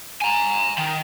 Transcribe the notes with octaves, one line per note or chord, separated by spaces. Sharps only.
G#5 A#5
D#3